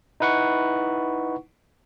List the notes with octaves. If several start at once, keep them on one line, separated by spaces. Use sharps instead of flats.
D#4 E4 B4 F#5 C#6